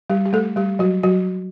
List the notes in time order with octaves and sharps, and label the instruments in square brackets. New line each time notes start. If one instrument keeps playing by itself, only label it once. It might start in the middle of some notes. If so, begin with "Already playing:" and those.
[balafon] G3 G4
G4
A3 A4
G3 G4
F#3 F#4
F#3 F#4